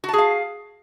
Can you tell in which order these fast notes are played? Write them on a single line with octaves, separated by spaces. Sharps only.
F#4 A5 G#4 F5